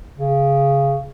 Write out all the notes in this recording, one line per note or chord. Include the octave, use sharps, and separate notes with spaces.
C#3